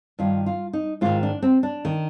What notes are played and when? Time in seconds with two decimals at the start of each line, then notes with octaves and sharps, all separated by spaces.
0.19 G2 D#3 F4
0.46 F4
0.73 D#4
1.01 G#2 D#3 F4
1.23 D4
1.42 C4
1.63 D4
1.85 D#3